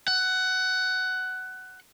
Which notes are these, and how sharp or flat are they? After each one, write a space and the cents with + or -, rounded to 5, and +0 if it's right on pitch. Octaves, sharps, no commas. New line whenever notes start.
F#5 +15